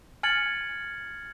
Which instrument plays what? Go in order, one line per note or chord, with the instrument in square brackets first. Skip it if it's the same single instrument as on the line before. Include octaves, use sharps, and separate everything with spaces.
[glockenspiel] G#5 F6 G#6 A6 C#7 F#7